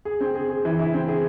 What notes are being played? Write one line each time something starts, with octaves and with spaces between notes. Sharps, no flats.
G#4
C4
G#4
G#4
E3
E4
C4
G#4